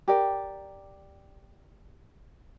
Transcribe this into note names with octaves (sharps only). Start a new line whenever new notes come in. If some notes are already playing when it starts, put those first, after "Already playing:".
G4 A#4 D5